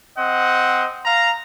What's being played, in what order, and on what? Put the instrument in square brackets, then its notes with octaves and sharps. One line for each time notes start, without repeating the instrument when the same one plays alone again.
[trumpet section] C4 D#5 F#5
F5 A#5